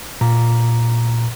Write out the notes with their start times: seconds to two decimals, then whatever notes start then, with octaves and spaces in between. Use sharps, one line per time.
0.21 A#2 A#5